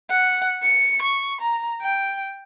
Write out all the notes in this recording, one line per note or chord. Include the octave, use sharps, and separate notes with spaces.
F#5
C#7
C#6
A#5
G5